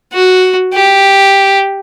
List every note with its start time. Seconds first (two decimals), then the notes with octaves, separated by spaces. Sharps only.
0.13 F#4
0.72 G4